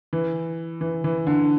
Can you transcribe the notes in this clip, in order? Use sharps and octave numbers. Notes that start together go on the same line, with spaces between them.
E3
E3
E3
D3